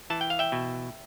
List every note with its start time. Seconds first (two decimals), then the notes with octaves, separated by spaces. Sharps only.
0.10 E3 A5
0.21 G5
0.30 F5
0.39 E5 G5
0.52 B2